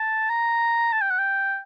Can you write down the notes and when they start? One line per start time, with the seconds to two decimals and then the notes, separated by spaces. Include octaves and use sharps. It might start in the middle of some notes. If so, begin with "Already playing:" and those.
Already playing: A5
0.30 A#5
0.93 A5
1.01 G5
1.10 F#5
1.19 G5